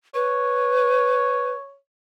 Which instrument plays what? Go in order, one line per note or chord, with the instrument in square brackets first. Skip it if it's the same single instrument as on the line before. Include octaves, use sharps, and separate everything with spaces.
[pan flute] B4 [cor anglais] C#5